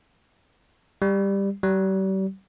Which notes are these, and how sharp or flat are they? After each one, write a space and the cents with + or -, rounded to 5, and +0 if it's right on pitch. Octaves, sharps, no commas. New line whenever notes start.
G3 +10
G3 -40